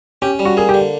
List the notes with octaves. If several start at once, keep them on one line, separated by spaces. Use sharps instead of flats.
C#4 G4
G3
F#4
A#3 G#4
G4
D3